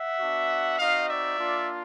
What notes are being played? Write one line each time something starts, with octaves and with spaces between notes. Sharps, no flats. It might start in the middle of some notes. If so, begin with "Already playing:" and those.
Already playing: E5 F#5
B3 D4 F#4
C4 D#4 F#4 D#5 F5
D5 E5
A#3 D4 F4